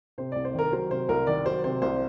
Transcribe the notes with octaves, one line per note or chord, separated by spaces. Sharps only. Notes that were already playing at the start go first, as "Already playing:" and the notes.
C3 C5
C2 D5
C5
D#3 A#4
F#3 C5
C3 C5
C2 A#4
D#3 D5
F#3 C5
C3 C5
C2 C5